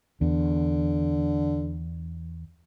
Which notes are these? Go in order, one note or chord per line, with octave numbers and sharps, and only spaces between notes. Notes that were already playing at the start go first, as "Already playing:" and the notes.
E2 D3